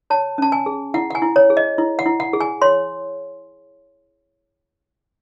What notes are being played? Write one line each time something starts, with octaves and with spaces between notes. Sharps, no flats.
C#5 A5
C#4 A5
G#5
G#4
E4 F#5
F#5
G#5
E4
C#5
G#4
D#5
E4
F#5
E4
F#5
G#4
G#5
C#5 C6